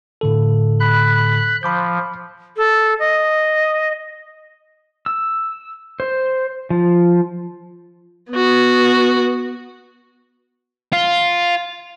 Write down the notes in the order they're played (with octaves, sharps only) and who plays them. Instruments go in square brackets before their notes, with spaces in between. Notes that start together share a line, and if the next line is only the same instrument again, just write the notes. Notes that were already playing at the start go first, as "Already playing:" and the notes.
[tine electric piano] A2 D3 A4
[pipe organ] B5 F#6
[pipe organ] F3 [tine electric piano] B5 D6 G6
[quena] A4
D#5
[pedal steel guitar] E6
C5
F3
[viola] B3 F#4
[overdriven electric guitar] F4